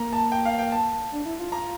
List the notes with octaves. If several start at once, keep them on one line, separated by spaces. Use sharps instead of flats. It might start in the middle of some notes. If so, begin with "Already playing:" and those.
Already playing: A#3 A#5
A5
G5
F5
G5
A5
D4
E4
F4
A#5